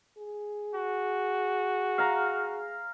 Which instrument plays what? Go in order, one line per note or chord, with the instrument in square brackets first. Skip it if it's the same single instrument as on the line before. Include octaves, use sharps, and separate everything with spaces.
[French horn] G#4
[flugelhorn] F#4
[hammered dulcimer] F5 A#5